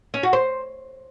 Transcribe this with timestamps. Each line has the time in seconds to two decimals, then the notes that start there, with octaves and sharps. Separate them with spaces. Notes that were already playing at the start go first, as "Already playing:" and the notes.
0.14 C#4
0.23 F#4
0.33 C5